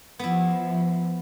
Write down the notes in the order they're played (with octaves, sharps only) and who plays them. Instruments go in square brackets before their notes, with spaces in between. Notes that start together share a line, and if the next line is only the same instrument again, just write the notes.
[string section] F3 [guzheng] B3 E4